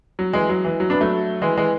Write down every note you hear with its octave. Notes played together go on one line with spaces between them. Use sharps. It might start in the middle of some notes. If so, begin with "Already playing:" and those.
F#3
E3 G#3
F#3
E3
F#3
B3 D4
F#3 A3
E3 G#3
E3 G#3